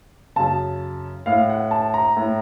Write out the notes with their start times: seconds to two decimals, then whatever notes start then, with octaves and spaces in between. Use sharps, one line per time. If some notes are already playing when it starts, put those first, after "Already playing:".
0.36 F#2 C#3 A5
1.26 A2 F5
1.50 F#5
1.71 A5
1.94 A#5
2.17 A2